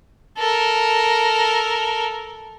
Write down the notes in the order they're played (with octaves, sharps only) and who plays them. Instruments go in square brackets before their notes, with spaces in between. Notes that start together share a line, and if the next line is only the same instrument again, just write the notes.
[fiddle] A4 A#4